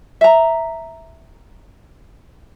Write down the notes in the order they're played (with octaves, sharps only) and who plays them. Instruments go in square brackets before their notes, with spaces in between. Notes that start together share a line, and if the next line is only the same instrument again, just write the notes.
[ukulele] E5 A#5